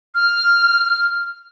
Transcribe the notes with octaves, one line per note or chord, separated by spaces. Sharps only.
F6